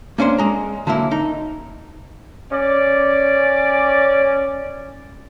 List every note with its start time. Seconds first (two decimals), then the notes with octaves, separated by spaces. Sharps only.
0.18 A#3 C#4 D4 C5
0.38 G#3 A#5
0.87 D3 F#3 A#3 E4
1.11 D#4
2.51 C#4 D5